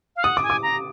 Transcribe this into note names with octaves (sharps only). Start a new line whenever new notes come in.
F5
F#5 D#6
D6
G#5
D6
A#5